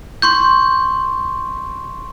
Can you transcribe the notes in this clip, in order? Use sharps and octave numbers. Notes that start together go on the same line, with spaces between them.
C6 C#6 G6